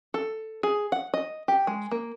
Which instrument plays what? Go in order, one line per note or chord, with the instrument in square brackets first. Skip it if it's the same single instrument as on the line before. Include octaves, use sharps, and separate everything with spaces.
[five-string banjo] A4
G#4
F#5
D#5
G4
G#3
A#3